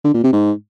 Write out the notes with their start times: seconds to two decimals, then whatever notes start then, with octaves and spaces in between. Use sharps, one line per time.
0.05 D3
0.14 A#2
0.23 C3
0.33 G#2